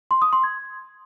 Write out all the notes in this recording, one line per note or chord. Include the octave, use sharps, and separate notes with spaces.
C6
D#6
C6
G#6